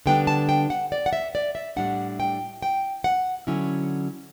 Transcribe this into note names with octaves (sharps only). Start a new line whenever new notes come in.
D3 G3 B3 D4 G5
A5
G5
F#5
D5
F#5
E5
D5
E5
A2 G3 D4 F#5
G5
G5
F#5
D3 F#3 C#4 E4